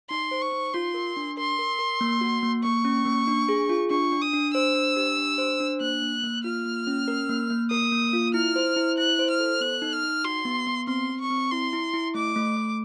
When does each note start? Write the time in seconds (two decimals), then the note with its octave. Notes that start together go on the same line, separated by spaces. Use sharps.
0.10 D#4 C6
0.31 C5
0.42 C#6
0.52 D#4
0.73 F4 C6
0.94 A#4
1.17 D4
1.37 A#4 C6
1.59 A#4
1.79 A#4
2.01 A#3
2.21 F#4
2.43 A#3
2.63 A#3 C#6
2.85 C#4
3.06 A#3
3.28 D4
3.49 G#4
3.69 F4
3.90 D4 C#6
4.12 D4
4.22 D#6
4.33 D4
4.54 C5 E6
4.75 D4
4.96 G4
5.18 D4
5.38 C5
5.60 D4
5.81 A#3 F#6
6.02 A#3
6.23 A#3
6.44 F4 F6
6.65 A#3
6.87 C#4
7.08 A#4
7.29 A#3
7.50 A#3
7.71 A#4 D#6
7.92 A#3
8.13 F4
8.34 E4 F6
8.56 C5
8.76 E4
8.98 E4 F#6
9.19 C5
9.30 F6
9.40 A4
9.61 B3 F#6
9.82 D#4
9.93 F6
10.03 D#4
10.24 F#4 C6
10.45 B3
10.67 B3
10.87 C4 C6
11.09 C4
11.20 C#6
11.30 C4
11.51 E4 C6
11.73 E4
11.94 E4
12.15 A3 D6
12.36 A3
12.56 A3